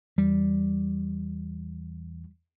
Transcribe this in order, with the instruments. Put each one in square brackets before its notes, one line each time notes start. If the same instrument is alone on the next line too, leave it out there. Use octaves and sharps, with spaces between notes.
[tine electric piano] E2 E3 [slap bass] G3